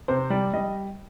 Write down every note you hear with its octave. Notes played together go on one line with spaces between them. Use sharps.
C3 C5
G3 D5
G3 D#5